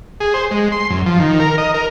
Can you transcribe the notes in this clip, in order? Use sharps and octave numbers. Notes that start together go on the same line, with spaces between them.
G#4
C5
G#3
C6
F#2
F3
D#3
A#4
D#5
A#4